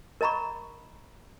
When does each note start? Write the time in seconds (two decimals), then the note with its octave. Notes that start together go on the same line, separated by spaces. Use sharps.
0.21 A#4 D#5 A#5 B5 C#6